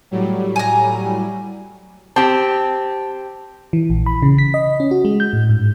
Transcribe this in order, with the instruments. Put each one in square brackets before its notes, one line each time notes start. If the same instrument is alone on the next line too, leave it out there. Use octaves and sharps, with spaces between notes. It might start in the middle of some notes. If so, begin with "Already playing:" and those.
[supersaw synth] A2 F#3 G3
[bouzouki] G#5 A#5
[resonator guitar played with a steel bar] C4 G4 [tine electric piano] A5
[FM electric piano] E3
A#1
B5
C#3
B6
D#5
C#4
F#4
G#3
G6
A2
G#2